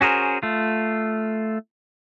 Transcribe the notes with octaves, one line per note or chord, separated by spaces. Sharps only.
C#4 F#4 G#4 A#4 C5
A3 F4